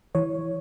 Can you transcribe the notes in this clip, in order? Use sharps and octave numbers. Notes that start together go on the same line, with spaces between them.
E3 C#5